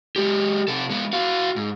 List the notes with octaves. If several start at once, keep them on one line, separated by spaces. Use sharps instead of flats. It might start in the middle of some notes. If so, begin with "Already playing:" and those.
G#3 G4
C3 A4
G#3 B3
F#4 F5
G#2